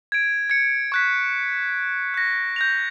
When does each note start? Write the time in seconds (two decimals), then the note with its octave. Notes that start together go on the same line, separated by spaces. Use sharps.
0.12 G#6 D7
0.50 G#6 C#7
0.92 C#6 F#6 B6
2.14 F#6 A#6
2.56 G6 A#6 F7